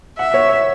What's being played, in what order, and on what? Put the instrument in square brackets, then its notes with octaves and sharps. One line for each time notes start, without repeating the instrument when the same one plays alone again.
[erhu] E5 [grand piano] F#5
[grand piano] C#5
C#5